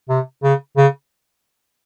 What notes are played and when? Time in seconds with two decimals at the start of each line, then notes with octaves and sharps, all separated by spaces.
0.09 C3
0.43 C#3
0.77 C#3